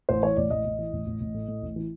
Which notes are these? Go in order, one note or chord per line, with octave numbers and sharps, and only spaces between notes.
A1 C5
E3 C#5
A1 D5
A1 D#5
A1
E3
A1
A1
A1
A2
A2
A1
E3